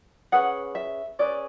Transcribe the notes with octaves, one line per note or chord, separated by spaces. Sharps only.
C#4 G#4 B4 F#5
E5
C#4 G#4 B4 D5